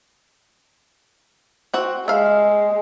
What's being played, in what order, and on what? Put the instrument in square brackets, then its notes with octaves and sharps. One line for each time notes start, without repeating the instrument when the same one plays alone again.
[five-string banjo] C4 F#4
[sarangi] G#3 [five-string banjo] E5 F5